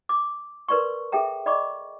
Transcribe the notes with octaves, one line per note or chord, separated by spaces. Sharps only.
D6
A#4 B4 D5 C6 C#6
G#4 A4 E5 G5 A#5
D5 D#5 B5 C#6 D6